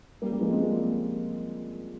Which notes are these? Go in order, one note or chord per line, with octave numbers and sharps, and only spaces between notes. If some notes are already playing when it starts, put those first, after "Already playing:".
G3 A#3
G3 A#3
F3 G#3
G#3 C4
G3 A#3